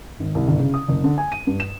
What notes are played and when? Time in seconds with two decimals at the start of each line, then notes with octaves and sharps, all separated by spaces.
0.20 G#1
0.35 C2
0.48 G1
0.59 C#3
0.74 D#6
0.88 F#1
1.04 D3
1.18 G#5
1.32 D#7
1.47 G2
1.60 E7